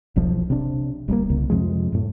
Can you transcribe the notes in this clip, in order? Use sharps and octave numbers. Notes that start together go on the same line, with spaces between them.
E1 B1 F3
C3 D4
D1 G3 A3 A#3
C2 C#3
F2 C3 F3 G#3
F#2 A2